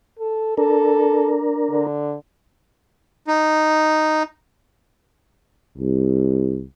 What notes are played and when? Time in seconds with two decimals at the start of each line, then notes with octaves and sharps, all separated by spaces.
0.19 A4
0.58 D4 A4 A#4
1.69 D3
3.28 D#4
5.78 C2